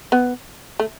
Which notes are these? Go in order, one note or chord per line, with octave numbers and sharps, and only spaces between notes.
B3
A3